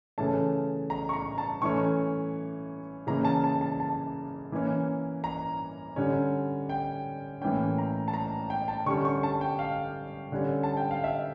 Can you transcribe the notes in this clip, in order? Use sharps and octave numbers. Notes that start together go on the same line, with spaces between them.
C#3 E3 A3 C#4 A5
A#5
C#6
A#5
A5
E3 A3 C#4 C#6
C#3 E3 A#3 C#4 A#5
A5
A5
A5
A5
E3 A#3 C#4
A#5
D3 G3 C#4
G5
A2 E3 A#3 C#4 G5
A#5
A5
A#5
G5
A5
D3 G3 C#4 C#6
C#6
A5
G5
F5
D3 G3 C#4
A5
G5
F5
E5